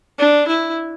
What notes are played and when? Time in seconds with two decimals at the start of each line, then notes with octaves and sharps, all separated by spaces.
0.19 D4
0.48 E4